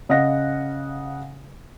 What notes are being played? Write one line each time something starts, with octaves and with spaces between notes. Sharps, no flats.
C#3 D#5 F5 F#5 A#6